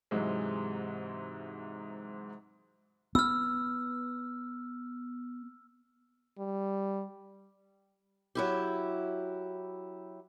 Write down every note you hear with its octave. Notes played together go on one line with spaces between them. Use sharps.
G#2 C3 E3 F#3 G#3
B3 E6 F6
G3
F#3 E4 G4